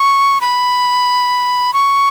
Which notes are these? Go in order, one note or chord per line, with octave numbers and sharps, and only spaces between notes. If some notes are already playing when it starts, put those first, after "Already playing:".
Already playing: C#6
B5
C#6